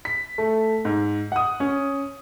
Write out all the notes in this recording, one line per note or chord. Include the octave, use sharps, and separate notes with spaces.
B6
A3
G#2
F#5 D#6
C#4